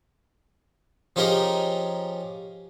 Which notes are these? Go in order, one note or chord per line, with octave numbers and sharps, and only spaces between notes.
F3 C#4 D#4 G4 G#4 A#4